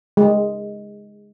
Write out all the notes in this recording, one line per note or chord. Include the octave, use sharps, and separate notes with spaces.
G#3